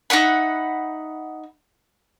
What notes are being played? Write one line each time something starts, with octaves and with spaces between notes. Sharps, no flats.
D#4 E5 F#5 B5